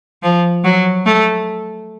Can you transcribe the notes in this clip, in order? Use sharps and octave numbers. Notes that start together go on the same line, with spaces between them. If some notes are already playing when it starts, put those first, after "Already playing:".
F3
F#3
A3